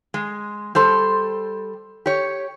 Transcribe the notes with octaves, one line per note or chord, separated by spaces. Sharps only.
G#3
G3 A4 C5
G4 C#5